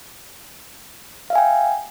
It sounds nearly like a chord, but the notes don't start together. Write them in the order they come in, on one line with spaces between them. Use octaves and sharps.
F5 E5 G#5 G5